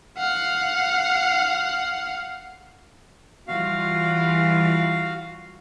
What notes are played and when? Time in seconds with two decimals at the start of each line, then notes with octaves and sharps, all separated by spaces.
0.18 F5 F#5
3.48 E3 G3 F4 F#4 F5